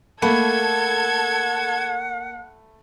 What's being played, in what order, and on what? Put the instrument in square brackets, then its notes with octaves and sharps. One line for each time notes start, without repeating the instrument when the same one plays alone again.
[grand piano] A3 A5 B5 [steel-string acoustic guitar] A#3 [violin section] A4 G#6 [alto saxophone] F#5